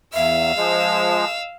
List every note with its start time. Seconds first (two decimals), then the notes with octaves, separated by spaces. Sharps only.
0.14 E2 E5 F5 E6
0.57 F3 G#3 D#5